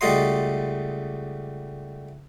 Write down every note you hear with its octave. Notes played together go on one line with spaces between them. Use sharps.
C#2 G3 A3 F#4 D#5 C6